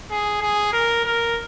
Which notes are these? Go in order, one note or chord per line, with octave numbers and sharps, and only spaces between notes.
G#4
G#4
A#4
A#4